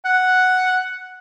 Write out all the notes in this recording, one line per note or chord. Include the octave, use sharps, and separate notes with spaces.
F#5